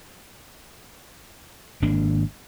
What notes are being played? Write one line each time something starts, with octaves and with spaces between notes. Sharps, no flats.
G#1 A#3 D4